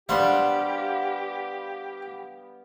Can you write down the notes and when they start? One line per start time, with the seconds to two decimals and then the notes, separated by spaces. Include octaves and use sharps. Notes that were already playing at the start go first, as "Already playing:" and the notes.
0.09 G3 B3 D4 G4 C5 F5 F#5